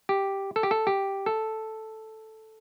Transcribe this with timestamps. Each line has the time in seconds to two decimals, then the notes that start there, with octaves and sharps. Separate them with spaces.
0.09 G4
0.56 A4
0.63 G4
0.71 A4
0.87 G4
1.26 A4